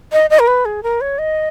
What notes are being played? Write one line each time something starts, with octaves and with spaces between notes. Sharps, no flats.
D#5
D#5
A#4
B4
G#4
A#4
C#5
D#5